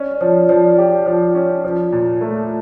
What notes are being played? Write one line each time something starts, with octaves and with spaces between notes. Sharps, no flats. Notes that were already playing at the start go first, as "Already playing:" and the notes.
Already playing: C#4 D5
D5
F3 C#5
F3 D5
G4
F3
C#4
F3
A#2
A3